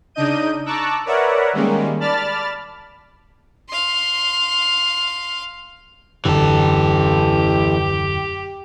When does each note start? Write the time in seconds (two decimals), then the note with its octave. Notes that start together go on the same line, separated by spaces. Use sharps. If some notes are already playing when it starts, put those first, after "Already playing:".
0.15 C#3 D4 D#4 D#5 G6 D#7
0.66 A5 A#5 C#6 D6 E6 F#6
1.05 A#4 B4 C#5 D5 E5 F#5
1.53 D#3 G3 G#3 A#3 C#4
2.00 D5 A5 B5 F6 A6
3.69 F5 C6
6.25 D#1 F#2 D3 E3 G4 A4